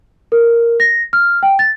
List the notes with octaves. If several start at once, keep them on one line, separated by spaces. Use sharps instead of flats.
A#4
A#6
F6
G5
A6